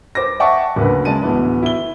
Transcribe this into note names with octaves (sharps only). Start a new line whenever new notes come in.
C5 D6 A#6
E5 F#5 G5 A5 C#6
F#1 D2 B4
C#3 G#3 A5 D#7
D1 E3 B3
E4 G7